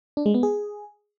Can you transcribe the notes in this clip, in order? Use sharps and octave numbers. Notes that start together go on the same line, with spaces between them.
D4
G#3
B3
G#4